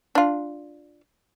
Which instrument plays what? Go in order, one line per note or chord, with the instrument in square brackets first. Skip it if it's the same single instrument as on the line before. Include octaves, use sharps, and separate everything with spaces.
[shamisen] D4 F4